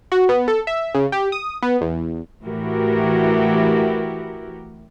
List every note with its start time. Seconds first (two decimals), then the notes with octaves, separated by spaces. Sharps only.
0.12 F#4
0.29 B3
0.48 A4
0.67 E5
0.95 C#3
1.12 G4
1.32 D#6
1.63 B3
1.81 E2
2.43 A2 E3 E4 F#4 G4 A#4